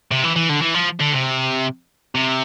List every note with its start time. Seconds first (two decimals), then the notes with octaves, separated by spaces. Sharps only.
0.11 C3
0.24 E3
0.36 E3
0.49 D3
0.62 E3
0.74 F3
1.00 D3
1.13 C3
2.15 C3